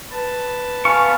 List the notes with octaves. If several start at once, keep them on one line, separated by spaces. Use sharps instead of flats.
B4 A5
B3 F5 G#5 C#6 C#7